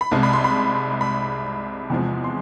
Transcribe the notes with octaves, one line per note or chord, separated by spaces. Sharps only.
B5
C2 C3 G#3 A5
B5
C6
B5
B5
E2 C3 F3 G#3
C6